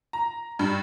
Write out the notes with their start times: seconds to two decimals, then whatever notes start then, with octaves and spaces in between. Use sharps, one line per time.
0.13 A#5
0.59 G2